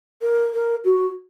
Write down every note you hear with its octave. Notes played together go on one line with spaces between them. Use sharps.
A#4
A#4
F#4